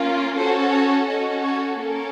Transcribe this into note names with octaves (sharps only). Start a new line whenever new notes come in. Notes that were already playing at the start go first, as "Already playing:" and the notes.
Already playing: A#3 C#4 F4
C#4 F#4 A4 C5
C#5
C#4 F#4 A4 D#5
C#5
A#3 C#4 A4 A#4